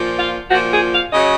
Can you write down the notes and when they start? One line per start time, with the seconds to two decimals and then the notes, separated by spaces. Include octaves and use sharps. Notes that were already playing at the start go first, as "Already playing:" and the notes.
Already playing: A#2 F3
0.18 F4
0.50 A#2 F3 F#4
0.72 G#4
0.93 F5
1.13 C#3 F#3 D#5